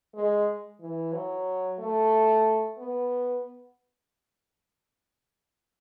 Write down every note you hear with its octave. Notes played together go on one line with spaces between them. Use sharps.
G#3
E3
F#3
A3
B3